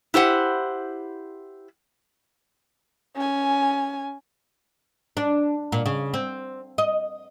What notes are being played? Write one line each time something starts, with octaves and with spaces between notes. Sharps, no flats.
E4 G4 C5 F#5
C#4 G#5
D4
A#2
C#3
C4
D#5